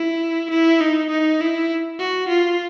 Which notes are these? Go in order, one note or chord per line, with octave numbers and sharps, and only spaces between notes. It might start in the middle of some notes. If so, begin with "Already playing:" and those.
Already playing: E4
E4
D#4
D#4
E4
F#4
F4